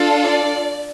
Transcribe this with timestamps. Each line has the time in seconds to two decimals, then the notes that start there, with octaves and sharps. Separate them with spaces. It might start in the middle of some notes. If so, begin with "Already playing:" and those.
Already playing: D4 F4 A4
0.24 D5